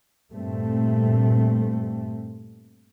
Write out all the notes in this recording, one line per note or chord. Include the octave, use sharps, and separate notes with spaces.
G2 A#2 A3 C4